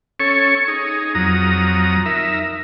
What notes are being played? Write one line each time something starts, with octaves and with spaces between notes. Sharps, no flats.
C#4 A4 C#5 C#6
D#4 G#4
F2 F#3 A#5 D#6
D#4 A#4 E5